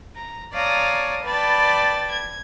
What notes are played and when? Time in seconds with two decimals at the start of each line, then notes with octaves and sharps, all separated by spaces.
0.14 A#5
0.53 C#5 D5 F5 A5 A#5 D#6
1.24 B4 D5 G5 A5 B5 A6
2.11 G#6